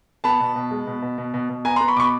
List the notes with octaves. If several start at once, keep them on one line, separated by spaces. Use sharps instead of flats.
B3 A5 B5
B2
B2
G#3
B2
B2
B2
B2
B2
B3 G#5 A#5
B3 A#5 C6
B5 C#6
B2 B5 C#6 D6